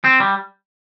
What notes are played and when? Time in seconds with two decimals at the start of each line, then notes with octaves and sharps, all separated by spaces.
0.04 C4
0.20 G3